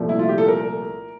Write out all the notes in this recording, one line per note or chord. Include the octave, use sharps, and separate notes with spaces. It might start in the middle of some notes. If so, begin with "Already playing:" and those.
Already playing: C2 A#2 F3 A3
E4
F4
G4
A4
A#4